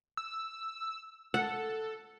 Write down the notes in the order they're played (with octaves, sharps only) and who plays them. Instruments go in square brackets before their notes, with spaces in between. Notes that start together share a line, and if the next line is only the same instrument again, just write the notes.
[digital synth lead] E6
[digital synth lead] A4 [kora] F#5